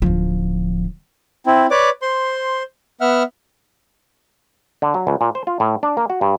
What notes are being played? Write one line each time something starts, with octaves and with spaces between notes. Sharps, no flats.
D1 F3
C4 E4
B4 C#5 D5 D6
C5 C6
B3 E5 F#5 F6
D3
F#3
C#2
A#2
C5
F4
A2
D4
A#3
F#4
G2